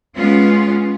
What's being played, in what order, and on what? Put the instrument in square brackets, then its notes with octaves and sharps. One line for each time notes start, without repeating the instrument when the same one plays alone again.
[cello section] G#3 B3 C#4 F4